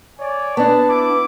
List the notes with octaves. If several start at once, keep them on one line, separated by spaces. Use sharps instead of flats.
C#5 D5 G#5
B3 D4 A5
E4 D6